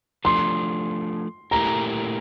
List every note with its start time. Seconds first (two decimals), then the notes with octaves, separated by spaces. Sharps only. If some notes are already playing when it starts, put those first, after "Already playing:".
0.25 F3 A3 D4 C6
1.51 A#2 A3 E4 G4 A#4 A#5